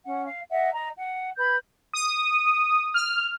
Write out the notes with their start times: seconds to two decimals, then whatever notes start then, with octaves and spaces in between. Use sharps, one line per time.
0.05 C#4 F#5
0.26 F5
0.50 D#5 E5 F#5
0.73 D#5 A#5
0.97 F#5
1.37 B4 B5 G6
1.93 D#6
2.94 F6